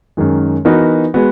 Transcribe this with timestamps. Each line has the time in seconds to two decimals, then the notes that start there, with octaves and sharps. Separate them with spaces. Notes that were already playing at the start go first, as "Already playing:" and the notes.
0.17 F#2 D#3 G#3
0.65 E3 B3 D#4 F#4 A#4
1.14 G#3 B3 F#4